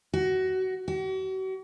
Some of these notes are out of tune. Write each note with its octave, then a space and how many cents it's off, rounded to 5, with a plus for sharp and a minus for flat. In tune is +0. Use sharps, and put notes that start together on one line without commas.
F#4 +20
F#4 +40